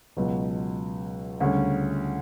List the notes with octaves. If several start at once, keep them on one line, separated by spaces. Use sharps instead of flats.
C#2 B2 F#3
D2 C#3 G3 C#4